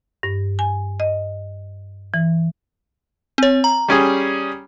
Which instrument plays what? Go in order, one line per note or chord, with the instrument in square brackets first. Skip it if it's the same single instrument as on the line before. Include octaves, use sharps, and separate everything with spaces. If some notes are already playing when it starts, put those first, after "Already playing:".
[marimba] G2
G#5
D#5
E3
[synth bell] C4 C#5
A#5
[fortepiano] G3 C#4 G#4